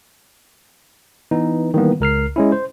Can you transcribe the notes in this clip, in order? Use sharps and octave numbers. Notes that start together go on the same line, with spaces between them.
E3 B3 D#4
D#3 E3 G3 A#3 B3
C#2 A#4 F6 C7
G#3 C#4 E4
C5